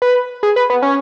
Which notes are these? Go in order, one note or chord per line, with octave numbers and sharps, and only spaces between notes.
B4
G#4
B4
B3
C#4